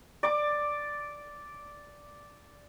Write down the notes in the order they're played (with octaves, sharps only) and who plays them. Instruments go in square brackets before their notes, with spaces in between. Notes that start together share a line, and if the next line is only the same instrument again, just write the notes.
[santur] D5 D6